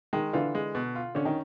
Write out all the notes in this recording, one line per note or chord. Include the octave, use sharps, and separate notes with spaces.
D#3 G#3
D3 E3 F4
G#3
B2
F4
D3 C#4
D#3